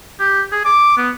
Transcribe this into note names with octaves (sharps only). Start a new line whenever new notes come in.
G4
G#4
D6
B3